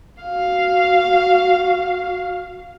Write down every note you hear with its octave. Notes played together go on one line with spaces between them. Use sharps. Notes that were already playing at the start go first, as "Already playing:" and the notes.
F#4 F5